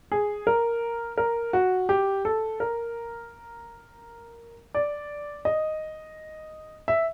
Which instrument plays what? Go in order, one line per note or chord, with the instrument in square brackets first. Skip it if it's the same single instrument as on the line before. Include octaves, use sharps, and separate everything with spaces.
[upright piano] G#4
A#4
A#4
F#4
G4
A4
A#4
D5
D#5
E5